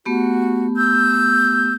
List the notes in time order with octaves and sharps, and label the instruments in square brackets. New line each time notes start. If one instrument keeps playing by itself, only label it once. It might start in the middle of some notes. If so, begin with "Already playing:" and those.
[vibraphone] A3 B3 G4 [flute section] F#4
[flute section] E6 G6